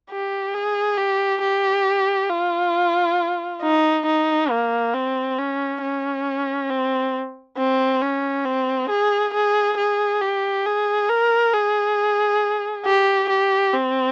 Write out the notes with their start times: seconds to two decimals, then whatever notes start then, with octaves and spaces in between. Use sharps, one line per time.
0.11 G4
0.54 G#4
0.98 G4
1.42 G4
2.30 F4
3.62 D#4
4.06 D#4
4.50 A#3
4.94 C4
5.38 C#4
5.82 C#4
6.70 C4
7.57 C4
8.02 C#4
8.46 C4
8.89 G#4
9.34 G#4
9.78 G#4
10.21 G4
10.66 G#4
11.09 A#4
11.54 G#4
12.86 G4
13.29 G4
13.74 C4